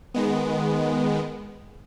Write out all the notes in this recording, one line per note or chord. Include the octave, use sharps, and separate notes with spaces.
D#3 G#3 B3